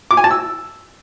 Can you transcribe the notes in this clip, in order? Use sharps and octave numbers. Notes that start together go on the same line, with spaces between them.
D6
G#5
A5
E6